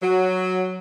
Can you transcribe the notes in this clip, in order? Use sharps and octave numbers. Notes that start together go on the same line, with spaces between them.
F#3